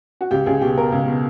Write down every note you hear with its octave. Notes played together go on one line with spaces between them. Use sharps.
F#4
C#2 G4
C#2 G#4
B2 G4
B2 A#4
C#2
B2